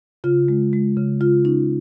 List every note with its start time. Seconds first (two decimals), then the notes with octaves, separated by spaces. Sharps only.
0.24 C#3 F4
0.48 G#3
0.73 G#3
0.97 C#3
1.21 C#3 F4
1.45 C#4 D#4